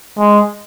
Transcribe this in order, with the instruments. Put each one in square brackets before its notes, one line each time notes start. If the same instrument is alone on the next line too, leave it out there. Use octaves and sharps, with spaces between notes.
[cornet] G#3